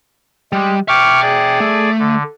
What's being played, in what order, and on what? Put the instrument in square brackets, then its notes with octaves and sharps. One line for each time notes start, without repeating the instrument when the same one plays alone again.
[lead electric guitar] G3 [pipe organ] G#3
[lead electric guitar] E5 G5 [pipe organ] C#6 D6 F6
[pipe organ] G#4 D5
[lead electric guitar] A3
[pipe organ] D3